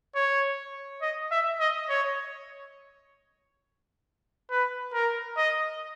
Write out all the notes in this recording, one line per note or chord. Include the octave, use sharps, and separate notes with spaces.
C#5
D#5
E5
D#5
C#5
B4
A#4
D#5